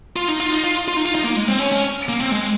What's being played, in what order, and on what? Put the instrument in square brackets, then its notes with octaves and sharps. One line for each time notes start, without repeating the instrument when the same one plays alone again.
[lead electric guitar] F4
D#4
F4
D#4
F4
F4
D#4
F4
D#4
A#3
G#3
C4
C#4
C#4
A#3
C4
G#3